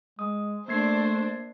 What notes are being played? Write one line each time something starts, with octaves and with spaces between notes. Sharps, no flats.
G#3 D#6
A3 A#3 D4 C5 G#6 C7